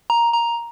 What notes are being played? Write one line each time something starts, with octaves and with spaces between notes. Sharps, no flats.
A#5
A#5